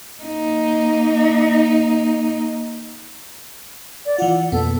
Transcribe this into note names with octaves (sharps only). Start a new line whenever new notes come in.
A#3 D#4
D5
E3 F4 F#5
F2 B2 A#3 B3 A4